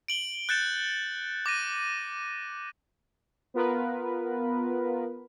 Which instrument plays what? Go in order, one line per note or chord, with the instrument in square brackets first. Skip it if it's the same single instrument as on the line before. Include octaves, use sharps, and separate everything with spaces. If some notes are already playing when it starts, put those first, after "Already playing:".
[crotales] D7 F#7 G7
F#6 G6 A6 C#7 D7 E7
D6 A#6 D#7
[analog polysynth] B3 F4 A#4 B4